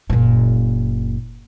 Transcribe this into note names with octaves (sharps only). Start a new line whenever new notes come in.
F#1 A#2